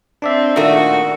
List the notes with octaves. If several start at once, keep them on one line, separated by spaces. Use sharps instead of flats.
C4 D4 D5 E5
A#2 D#3 A3 F#4